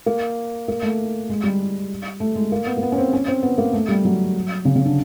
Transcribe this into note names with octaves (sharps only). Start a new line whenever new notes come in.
A#3
A#3
A3
G#3
G3
A3
G#3
A#3
B3
A#3
B3
C#4
C4
C#4
C4
B3
A#3
A3
G3
F#3
C#3
C#3
D3